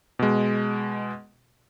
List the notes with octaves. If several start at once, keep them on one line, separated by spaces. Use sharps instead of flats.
B2 G#3